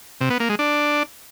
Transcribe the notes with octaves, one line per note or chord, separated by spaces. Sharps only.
C3
B3
A#3
G#3
D4